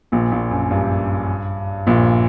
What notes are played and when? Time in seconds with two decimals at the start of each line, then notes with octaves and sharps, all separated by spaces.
0.12 A#1 A#2
0.32 A#1 A#2
0.51 F#2
0.71 G2
1.87 A#1 A#2